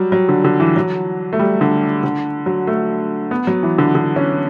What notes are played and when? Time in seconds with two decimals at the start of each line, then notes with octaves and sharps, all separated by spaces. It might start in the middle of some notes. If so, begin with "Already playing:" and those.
Already playing: F#3 G3
0.12 F#3
0.29 D3
0.44 D3
0.60 E3
0.76 F#3
1.33 A3
1.39 G3
1.61 D3
2.03 D3
2.46 F#3
2.67 A3
3.31 B3
3.47 F#3
3.63 E3
3.78 D3
3.95 D3
4.16 C#4